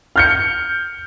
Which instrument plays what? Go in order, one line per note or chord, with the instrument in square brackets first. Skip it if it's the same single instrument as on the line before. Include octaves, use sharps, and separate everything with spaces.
[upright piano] F6 G6 C#7